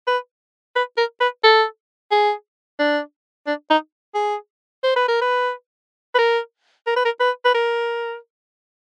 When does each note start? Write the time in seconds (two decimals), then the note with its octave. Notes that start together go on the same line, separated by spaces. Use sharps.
0.07 B4
0.76 B4
0.97 A#4
1.21 B4
1.44 A4
2.11 G#4
2.79 D4
3.47 D4
3.70 D#4
4.15 G#4
4.83 C5
4.96 B4
5.08 A#4
5.21 B4
6.14 B4
6.18 A#4
6.87 A#4
6.96 B4
7.05 A#4
7.20 B4
7.45 B4
7.54 A#4